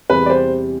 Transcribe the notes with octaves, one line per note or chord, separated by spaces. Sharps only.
E2 C3 G3 B4
D5
C5